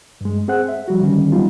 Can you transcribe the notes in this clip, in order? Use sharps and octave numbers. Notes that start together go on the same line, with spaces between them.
G2 G#3
C4 G#4 C5 F#5 F#6
E5
F3 G3 F#4
D3 D#3 G3 C#4
E3 F#3 G3 B3 D#4 F4